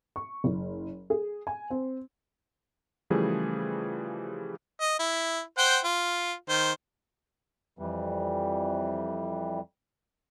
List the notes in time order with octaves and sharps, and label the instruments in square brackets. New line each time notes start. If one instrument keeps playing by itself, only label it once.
[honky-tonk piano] C#6
F#1
G#4
G#5
C4
[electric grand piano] C#3 E3 F3 G3 A3 G#4
[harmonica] D#5
E4
C5 F#5 G5
F4
D#3 C5
[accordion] F2 E3 G3